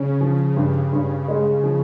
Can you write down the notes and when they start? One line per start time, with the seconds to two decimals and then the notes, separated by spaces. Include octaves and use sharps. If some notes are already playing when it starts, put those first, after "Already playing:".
Already playing: C#3 C#4
0.21 C#3 F3
0.56 G2
0.93 G2
1.28 G#3
1.64 F3